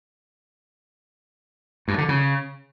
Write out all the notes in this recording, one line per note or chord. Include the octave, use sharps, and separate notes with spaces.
G2
D3
C#3